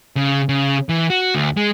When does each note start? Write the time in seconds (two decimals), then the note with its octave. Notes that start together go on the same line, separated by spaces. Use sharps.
0.17 C#3
0.49 C#3
0.89 E3
1.10 F#4
1.35 D2
1.57 G#3